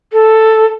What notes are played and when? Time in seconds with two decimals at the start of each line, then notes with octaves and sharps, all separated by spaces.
0.13 A4